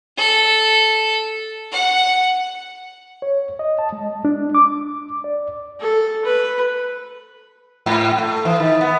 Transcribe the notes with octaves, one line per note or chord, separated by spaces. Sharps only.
A4
F#5
C#5
D#5
A5
G#3
D4
D6
D5
A4
B4
G#2
A3
E3
D#3
B3